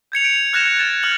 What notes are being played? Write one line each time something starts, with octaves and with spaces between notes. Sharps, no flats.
G6 G#6 C#7 F7
D7
F6 F#6 G#6 A#6 E7 F7
A6 E7
F6 F#6 G#6 F#7